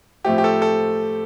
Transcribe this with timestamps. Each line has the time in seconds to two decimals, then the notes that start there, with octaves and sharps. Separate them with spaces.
0.25 A2 F3 A3 C4 G4
0.38 G4
0.44 A4
0.62 A4